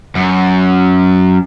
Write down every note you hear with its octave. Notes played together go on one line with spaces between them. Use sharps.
F#2